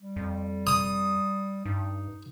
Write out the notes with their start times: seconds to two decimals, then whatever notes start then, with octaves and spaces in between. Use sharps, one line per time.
0.01 G3
0.16 F2
0.67 D#6
1.65 G2 D#4